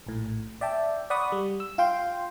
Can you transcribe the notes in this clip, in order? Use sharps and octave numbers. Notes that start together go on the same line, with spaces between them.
A#1 A2
D5 E5 G5 A5
D5 F#5 B5 C#6 D#6
G3
E6
F4 F5 G5 C6